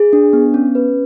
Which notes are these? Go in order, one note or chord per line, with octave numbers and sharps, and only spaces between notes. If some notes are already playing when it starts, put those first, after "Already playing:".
Already playing: G#4
D4
B3
C#4
B4